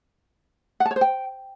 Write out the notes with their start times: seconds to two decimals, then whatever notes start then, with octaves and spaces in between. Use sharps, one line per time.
0.80 F#5
0.86 A5
0.91 C#5
0.96 C5
1.01 G5